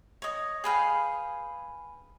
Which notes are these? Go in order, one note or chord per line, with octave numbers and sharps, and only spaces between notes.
C#5 D#5
G#4 B4 F5 G5